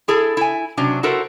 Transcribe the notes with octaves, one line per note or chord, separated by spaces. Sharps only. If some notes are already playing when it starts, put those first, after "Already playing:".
E4 G#4 A4
E4 G#5
C3 F#3 C#4 D4
E4 F#4 A4 A#4 C5